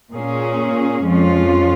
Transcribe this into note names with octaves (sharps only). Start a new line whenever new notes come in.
A#2 A#3 C#4 G#4
F2 F3 G#3 C#4 F4